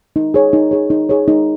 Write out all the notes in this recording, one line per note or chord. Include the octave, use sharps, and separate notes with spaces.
D#4
G#4 C#5
D#4
G#4 C#5
D#4
G#4 C#5
D#4